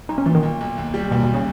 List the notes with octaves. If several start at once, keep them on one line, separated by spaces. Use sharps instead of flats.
B1 D#4
C#4
A#2 E3
D#3
B1
B1
D#2
G3
D#2 B2
B2
C#3